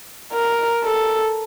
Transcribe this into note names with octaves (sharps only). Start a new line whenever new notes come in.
A#4
A4